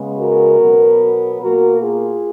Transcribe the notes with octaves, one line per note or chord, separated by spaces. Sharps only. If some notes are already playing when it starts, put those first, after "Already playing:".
Already playing: C#3 G#3 B3
F#4 A#4
B2 F#3 B3
B2 A#3 F#4 A#4
F4 G#4